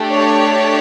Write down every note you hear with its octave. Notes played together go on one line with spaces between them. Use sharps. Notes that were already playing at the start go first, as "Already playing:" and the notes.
Already playing: A3 D4 G4
C#5